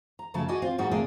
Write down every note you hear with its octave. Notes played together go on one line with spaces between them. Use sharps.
A#5
F#2 C#3 F3 A3 A5
F#4 G#4 D5 D#5 G#5
C4 F4
G#2 G3 A#3 F#4 G#4
C3 A3 A#3 G#4 D5